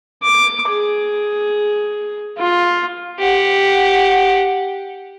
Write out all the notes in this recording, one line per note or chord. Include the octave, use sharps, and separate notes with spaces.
D6
G#4
F4
G4 F#5